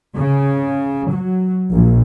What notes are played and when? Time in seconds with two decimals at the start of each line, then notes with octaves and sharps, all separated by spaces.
0.16 C#3
1.14 F#3
1.71 A#1